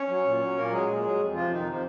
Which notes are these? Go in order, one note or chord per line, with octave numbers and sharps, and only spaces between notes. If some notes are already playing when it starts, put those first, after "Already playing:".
Already playing: C#4 C#5
F#3
A#2
F#3
A#2 A#3 A#4
F#3 G#3 G#4
A#2
F#3
F2
C3 F3 F4
F2 D#3 D#4
C3 F3